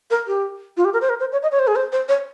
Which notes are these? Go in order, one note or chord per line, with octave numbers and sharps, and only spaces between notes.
A#4
G4
F4
G4
A#4
C5
A#4
C5
C#5
D#5
C#5
C5
G#4
C5
C5
C#5